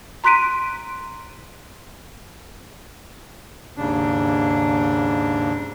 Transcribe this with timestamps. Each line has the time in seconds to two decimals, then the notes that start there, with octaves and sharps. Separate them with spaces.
0.24 A#5 C6 F#6 B6 D7 D#7
3.77 D#2 G#2 C#3 D4